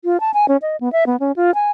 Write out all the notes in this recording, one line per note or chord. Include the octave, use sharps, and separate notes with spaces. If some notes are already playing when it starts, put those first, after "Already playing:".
F4
A5
G#5
C#4
D#5
B3
E5
B3
C#4
F4
G#5